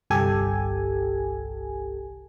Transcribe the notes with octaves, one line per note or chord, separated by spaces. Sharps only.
G1 C2 G4 A4 G#5